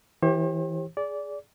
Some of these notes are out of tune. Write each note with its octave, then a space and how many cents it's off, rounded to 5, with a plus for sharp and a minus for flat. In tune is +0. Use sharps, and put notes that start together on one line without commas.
E3 -15 G4 +0 C5 +45
G#4 +0 D5 -20